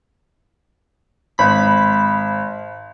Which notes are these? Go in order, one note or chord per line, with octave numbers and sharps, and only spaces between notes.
G#1 B5